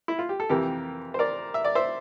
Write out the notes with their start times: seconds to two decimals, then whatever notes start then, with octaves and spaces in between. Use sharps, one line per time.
0.08 E4
0.19 F4
0.29 G4
0.40 A4
0.49 F2 C3 E3 G4 A#4
1.14 C5
1.19 A#4 D5
1.54 E5
1.65 D5
1.75 C5 E5